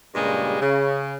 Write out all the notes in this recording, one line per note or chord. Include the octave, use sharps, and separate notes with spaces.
G2 A#2 C#3 G3 G#3
C#3